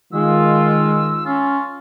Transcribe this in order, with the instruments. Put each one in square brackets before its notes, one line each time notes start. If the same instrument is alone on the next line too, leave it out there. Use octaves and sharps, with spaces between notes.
[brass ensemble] D#3 F4 [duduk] G#3 [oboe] E6
[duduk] C#4 [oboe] F4